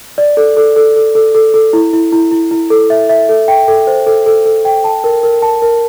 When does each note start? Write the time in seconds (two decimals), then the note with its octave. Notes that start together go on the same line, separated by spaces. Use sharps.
0.18 D5
0.37 A4
0.57 A4
0.76 A4
0.96 A4
1.15 A4
1.35 A4
1.54 A4
1.73 E4
1.93 E4
2.12 E4
2.31 E4
2.51 E4
2.70 A4
2.90 E5
3.09 E5
3.29 A4
3.48 G5
3.68 A4
3.87 C5
4.06 A4
4.26 A4
4.46 A4
4.65 G5
4.84 A5
5.04 A#4
5.23 A#4
5.43 A5
5.62 A#4